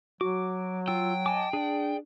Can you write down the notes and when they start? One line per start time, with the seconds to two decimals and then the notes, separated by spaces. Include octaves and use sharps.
0.21 F#3 F#4 D6
0.88 F4 G5 E6
1.26 D#5 G#5 A5 D6
1.53 D4 G#4 D5